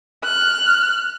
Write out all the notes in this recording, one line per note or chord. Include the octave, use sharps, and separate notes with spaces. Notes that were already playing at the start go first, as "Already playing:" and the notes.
F6 F#6